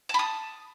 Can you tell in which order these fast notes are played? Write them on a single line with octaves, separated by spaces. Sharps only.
A5 B5 D#6